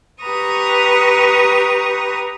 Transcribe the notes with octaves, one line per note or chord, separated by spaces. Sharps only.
G4 B4 A#5 C#6 D#6